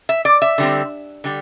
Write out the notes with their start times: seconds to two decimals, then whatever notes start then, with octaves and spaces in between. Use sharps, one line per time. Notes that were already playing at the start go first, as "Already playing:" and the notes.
0.09 E5
0.25 D5
0.42 E5
0.58 D3 G3 C4
1.24 D3 G3